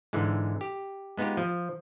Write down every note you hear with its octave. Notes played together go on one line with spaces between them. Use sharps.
G#2 D3 E3 G#3
G4
G#3 B3 D#4 F4 G4
F3